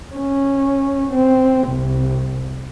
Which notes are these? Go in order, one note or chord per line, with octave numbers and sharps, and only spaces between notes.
C#4
C4
C2